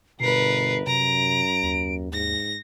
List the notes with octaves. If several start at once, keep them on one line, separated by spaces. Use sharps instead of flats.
G1 B2 A#4 B4 C7
F#2 C3 A#5 D7
D#2
G#2 A#6